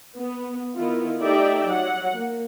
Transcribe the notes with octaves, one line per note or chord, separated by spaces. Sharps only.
B3
D#3 B3 E4 F4
A3 D#4 G4 D5 E5 G5
F#3 F#5
A#3